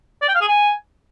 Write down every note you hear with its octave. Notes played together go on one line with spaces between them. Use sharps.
D5
G5
F5
G#4
G#5